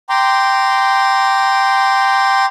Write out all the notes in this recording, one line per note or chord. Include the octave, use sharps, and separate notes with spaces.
G5 A#5 C6 D6